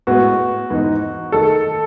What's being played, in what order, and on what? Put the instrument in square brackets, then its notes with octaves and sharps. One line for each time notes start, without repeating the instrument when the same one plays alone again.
[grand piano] A2 G#3 B3 [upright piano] F#4
[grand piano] G#2 E3 B3 D#4
[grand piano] D#3 A3 D#4 [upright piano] A4